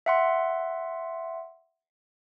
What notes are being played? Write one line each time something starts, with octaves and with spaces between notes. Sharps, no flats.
E5 F#5 C6